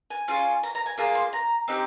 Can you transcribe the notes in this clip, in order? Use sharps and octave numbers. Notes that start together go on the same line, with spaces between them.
G#5
C#4 F4 G#4
A#5
A#5
G#5
A#3 F4 G#4 A#5
C6
A#5
C4 D#4 G4